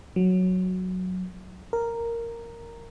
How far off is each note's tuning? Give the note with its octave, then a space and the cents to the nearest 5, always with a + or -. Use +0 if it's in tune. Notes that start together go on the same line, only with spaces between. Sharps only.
F#3 -5
A#4 -5